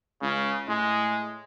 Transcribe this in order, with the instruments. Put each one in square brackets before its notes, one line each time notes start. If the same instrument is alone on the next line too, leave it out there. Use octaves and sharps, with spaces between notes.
[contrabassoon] C#2 [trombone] C#3
[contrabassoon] A2 [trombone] G#3